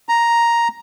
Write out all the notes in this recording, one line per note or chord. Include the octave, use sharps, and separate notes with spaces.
A#5